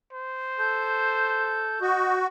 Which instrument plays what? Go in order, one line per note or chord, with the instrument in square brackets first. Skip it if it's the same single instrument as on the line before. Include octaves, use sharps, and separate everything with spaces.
[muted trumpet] C5
[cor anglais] A4 [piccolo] G6
[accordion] F#4 [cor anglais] D#5